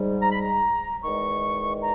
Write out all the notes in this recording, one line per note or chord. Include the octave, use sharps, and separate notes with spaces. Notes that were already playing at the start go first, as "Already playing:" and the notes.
Already playing: G#2 G3
A#5
B5
A#5
E2 D#3 G#3 C#6
A#5